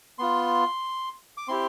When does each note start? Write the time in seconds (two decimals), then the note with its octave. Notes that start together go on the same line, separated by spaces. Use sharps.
0.19 B3 F4 C6
1.37 D6
1.48 C4 E4 G4 C6